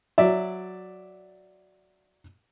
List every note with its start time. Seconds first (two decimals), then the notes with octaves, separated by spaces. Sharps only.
0.18 F#3 D5 E5